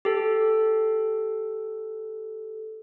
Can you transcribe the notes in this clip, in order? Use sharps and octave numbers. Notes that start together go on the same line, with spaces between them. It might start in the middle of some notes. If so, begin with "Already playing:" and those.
G4 A4